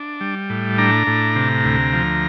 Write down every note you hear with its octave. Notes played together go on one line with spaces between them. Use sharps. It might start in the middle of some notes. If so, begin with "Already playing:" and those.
Already playing: D4
G3
A2
D4 A#5
A2
C3
D2
F3